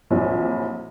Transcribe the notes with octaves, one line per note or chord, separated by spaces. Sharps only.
A#1 F2 A#2 E3 F#3 G3